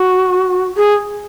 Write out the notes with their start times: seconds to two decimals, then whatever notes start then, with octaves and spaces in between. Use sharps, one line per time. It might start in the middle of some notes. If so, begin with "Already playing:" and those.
Already playing: F#4
0.77 G#4